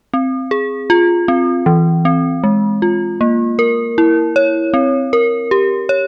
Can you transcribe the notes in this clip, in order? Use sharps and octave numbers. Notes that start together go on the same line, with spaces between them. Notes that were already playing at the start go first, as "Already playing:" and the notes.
C4
G#4
F4
C4
E3
C4
G#3
F4
A#3
A#4
E4
C#5
C4
A#4
G4
C#5